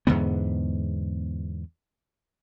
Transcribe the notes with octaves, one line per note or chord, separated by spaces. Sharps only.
E2 G#2 D3 B3